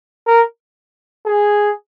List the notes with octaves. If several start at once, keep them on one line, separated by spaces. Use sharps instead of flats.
A#4
G#4